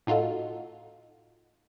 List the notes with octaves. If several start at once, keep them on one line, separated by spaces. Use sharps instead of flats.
A2 D#4 F4 F#4 A4